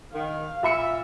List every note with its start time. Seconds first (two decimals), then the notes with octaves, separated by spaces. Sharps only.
0.14 D#3 F5
0.63 A#2 E5 B5 C#7